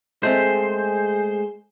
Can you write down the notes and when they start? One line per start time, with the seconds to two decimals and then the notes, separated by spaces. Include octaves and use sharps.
0.23 G#3 A3 C4 G#4 C5